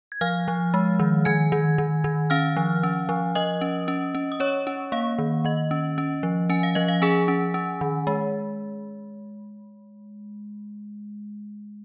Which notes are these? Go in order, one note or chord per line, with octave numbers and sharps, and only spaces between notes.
G#6
F3 F5 F6
F3
G#3
D#3
D#3 G#5 G#6
D#3
D#3
D#3
C#4 F5 F6
F3
C#4
F3
F3 D#5 D#6
C#4
C#4
C#4
D#6
C#4 C#5 C#6
C#4
A#3 F5
D#3
D#3 D#5
C#4
C#4
F3
C#4 G#5
F5
F3 D#5
F5
C#4 G#4 G#5
C#4
C#4
D#3
G#3